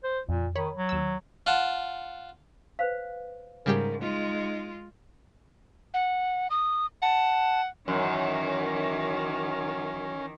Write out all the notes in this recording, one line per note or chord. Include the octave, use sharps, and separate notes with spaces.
C5
F2 A#2
D#3 C#5 B5
F#3
D#2 E6
F4 F#5 A5
B4 C5 F5
G#2 C#3 G3 G4 A#4
G#3 D#4 F4
F#5
D#6
F#5 A5
F#2 D#3 E3 C#4